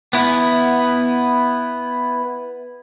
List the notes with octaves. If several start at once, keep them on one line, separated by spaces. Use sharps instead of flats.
B3 E4